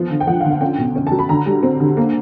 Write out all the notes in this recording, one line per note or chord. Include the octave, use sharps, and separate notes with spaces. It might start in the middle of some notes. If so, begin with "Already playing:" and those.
Already playing: F3 B3
D3
G5
F3 F#5
D3 F5
F#5
C#4 G5
B2
C#4
F#3 A5
B5
D3 A#5
G3
C4
D3
A#3